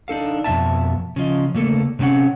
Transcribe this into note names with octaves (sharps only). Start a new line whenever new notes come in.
D4 D#4 A4 F5
F2 B2 E5 A5
C#3 F3 D#5
C#3 A3 A#3 A4
C3 G3 C4 C#4 F#5